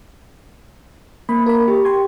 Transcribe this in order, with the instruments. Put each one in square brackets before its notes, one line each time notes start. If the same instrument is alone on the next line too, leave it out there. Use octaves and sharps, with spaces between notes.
[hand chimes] A#3 [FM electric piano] B5
[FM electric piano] A#4 B5
[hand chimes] G4
[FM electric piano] G5 C6 G#6